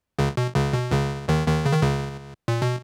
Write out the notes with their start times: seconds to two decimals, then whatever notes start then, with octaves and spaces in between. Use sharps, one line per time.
0.19 C#2 C#3
0.37 B2
0.55 C#2 C#3
0.73 B2
0.92 C#2 C#3
1.28 D#2 D#3
1.47 D#2 D#3
1.66 C#3
1.73 D#3
1.82 C#2 C#3
2.48 A#2
2.62 B2